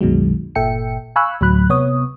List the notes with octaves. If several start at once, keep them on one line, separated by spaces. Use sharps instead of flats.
C2 F#2 B2 D#3 F#3 G#3
G1 A#2 A4 E5 G5 C#7
F5 G#5 B5 C#6 E6 F#6
D2 A2 F#3 B5 F#6
C3 B3 C#5 D#6